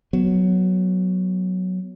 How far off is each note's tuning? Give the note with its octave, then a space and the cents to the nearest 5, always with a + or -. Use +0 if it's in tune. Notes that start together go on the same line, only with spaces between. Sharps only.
F#3 +0 B3 +0